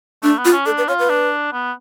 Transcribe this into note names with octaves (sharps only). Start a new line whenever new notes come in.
A3 D4
B3
F4
C#4
D4 A4
B4
F4 C#5
B4
D4
B3